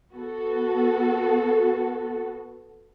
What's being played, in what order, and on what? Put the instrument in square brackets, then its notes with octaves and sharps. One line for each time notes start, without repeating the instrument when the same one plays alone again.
[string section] B3 F#4 A4